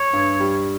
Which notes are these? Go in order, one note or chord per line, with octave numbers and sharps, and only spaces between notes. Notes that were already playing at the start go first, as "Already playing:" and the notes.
Already playing: C#5
G2
G3